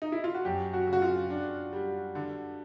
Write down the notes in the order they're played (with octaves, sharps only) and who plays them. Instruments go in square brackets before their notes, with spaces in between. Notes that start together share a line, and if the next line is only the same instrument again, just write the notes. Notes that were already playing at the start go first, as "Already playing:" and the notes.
[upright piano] D#4
E4
F4
F#4
[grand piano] F#2 [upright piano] G4
[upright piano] F#4
[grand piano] C#3
[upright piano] F#4
F4
[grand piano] D4
G3
D3